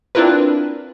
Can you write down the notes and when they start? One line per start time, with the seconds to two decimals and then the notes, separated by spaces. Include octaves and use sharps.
0.15 C4 D4 E4 F4 A#4 B4